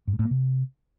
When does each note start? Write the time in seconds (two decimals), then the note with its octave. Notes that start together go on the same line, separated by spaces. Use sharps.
0.07 G2
0.13 G#2
0.19 A2
0.25 A#3
0.31 C3